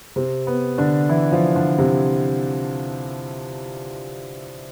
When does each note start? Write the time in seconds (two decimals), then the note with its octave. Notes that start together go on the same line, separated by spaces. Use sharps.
0.16 C3 C4
0.47 B3
0.78 D3 D4
1.09 E3 E4
1.32 F3 F4
1.56 D3 D4
1.78 C3 C4